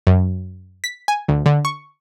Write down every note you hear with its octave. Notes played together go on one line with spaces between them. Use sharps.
F#2
B6
G#5
D2
D3
C#6